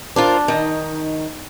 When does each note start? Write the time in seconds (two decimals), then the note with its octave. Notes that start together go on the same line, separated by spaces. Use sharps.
0.16 D4 F4 A#4 C5
0.48 D#3 D#4